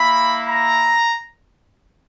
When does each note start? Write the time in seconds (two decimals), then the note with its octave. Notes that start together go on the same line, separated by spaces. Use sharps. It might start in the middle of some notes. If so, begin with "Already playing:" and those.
Already playing: A#3 E4 B5
0.48 A#5